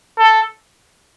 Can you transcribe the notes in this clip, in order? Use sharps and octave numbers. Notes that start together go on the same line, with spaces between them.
A4